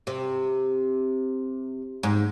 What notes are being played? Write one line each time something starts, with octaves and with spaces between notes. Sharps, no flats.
C3
G#2